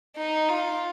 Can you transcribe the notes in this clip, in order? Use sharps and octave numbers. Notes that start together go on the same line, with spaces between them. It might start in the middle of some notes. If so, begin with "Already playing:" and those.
D#4
F4